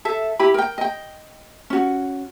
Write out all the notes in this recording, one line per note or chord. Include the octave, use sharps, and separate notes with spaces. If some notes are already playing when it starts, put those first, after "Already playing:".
A4 E5
E4 G4 B5
A#4 G5
D#5 G5
C#4 F#4